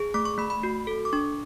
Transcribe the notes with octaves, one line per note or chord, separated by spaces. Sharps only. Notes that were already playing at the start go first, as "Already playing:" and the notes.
Already playing: G#4
A3 D6
C#6
A3 B5
B5
F#4
A4
D6
D4 C#6